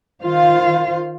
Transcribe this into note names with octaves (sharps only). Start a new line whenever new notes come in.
D#3 F4 C5 F5